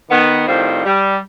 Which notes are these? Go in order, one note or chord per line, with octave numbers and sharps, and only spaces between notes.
D#3 B3
A2 D#3 F3 G3 C4
G3